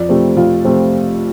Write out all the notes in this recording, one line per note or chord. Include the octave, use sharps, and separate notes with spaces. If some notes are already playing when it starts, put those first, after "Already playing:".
Already playing: F2 D5
C3 F3 A3 C4
F2 F4
C3 F3 A3 C4